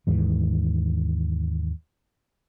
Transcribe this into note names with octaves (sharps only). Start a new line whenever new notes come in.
D#2 G#2 E3